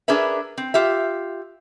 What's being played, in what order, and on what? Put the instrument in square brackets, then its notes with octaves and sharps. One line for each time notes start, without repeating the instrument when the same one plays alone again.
[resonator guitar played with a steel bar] D4 G#4 A#4 B4 E5
C4
F4 G4 E5